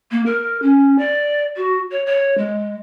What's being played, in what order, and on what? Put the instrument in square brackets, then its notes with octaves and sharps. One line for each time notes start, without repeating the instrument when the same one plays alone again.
[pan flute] A#3
A#4
C#4
D5
F#4
C#5
C#5
G#3